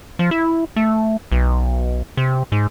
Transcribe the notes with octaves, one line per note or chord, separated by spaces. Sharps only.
F3
E4
A3
B1
C3
G#2